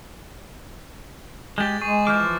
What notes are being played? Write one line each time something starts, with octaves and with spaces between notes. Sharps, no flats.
G#3 G4 G6 A6
G#3 G#4 C#6
E3 F3 D6 F6 G6